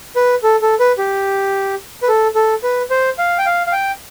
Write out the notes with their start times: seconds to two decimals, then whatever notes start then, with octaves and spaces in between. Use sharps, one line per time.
0.16 B4
0.43 A4
0.62 A4
0.80 B4
0.98 G4
2.03 B4
2.08 A4
2.35 A4
2.63 B4
2.91 C5
3.18 F5
3.38 G5
3.46 F5
3.67 F5
3.72 G5